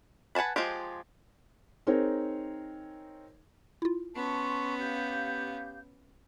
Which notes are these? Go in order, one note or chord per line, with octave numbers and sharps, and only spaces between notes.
B4 F#5 G#5 A5 B5
F3 G#3 F4 G4
C4 D#4 G#4 A#4 C#5
E4 F4
B3 C#4 A5 C6 C#6
G4 F5 G6